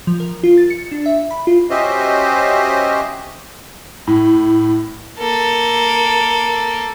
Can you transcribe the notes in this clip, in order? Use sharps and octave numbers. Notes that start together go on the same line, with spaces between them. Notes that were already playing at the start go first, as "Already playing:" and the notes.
F3
A#4
F4
A6
C#7
D4
E5
B5
F4
C#4 F#4 G4 C5 D#5 E5
A2
A#3 A4